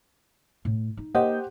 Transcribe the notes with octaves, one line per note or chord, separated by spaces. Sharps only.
A2
D#4
A#3 G4 C5 D#5 F#5 G6